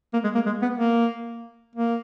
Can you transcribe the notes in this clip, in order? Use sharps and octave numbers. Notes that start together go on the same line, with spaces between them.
A#3
G#3
A#3
G#3
B3
A#3
A#3